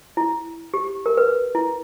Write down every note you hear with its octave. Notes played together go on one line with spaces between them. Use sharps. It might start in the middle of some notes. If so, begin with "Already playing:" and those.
E4
G4
A#4
B4
E4